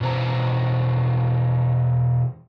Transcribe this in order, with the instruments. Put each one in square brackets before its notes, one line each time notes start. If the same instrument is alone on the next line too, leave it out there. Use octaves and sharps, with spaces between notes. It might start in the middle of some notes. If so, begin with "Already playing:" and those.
[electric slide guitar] B2 E3 B4 C5 A#5